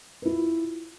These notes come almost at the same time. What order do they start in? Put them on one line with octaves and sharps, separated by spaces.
B4 E4 F4